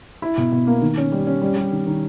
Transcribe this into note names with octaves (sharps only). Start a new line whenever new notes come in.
E4
B2
B2
A#3
D#3
C#4
G3
C#4
G3
G3
D#3
D#3